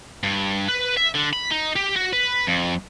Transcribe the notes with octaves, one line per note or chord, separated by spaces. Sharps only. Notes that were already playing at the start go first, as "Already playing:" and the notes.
G2
B4
E5
D3
B5
D#4
G4
F#4
B4
F2